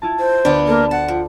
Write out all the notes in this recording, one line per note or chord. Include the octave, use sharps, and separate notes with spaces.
E4 F4 A5
C5
D2 B3 D4 F6
A#3 A4
F#5 A5
F3